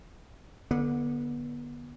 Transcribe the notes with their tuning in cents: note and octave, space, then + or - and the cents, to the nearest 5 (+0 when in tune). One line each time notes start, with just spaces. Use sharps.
D3 -5 B3 -35